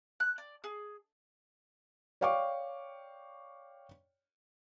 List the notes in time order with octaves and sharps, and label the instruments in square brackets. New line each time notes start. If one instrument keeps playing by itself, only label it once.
[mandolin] F#6
D5
G#4
[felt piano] C#5 D5 F5 G5 C#6 D6